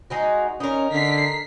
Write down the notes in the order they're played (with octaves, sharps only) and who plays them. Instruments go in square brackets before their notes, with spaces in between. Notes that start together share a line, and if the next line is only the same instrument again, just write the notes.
[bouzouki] G#3 D#4 F#4
[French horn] C#4 [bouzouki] D#4 A#4
[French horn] D3 [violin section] B6 C7